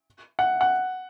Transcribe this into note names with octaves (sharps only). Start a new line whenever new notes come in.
F#5
F#5